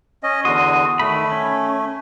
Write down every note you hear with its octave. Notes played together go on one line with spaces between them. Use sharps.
C#4 D#5
E2 D3 F#4 C6 D#6
D#3 A3 B5
C#4